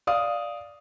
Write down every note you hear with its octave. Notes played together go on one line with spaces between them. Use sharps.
D5 F5 D#6